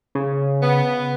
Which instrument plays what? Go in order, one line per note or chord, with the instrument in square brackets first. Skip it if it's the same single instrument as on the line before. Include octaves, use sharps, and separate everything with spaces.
[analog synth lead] C#3
[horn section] B3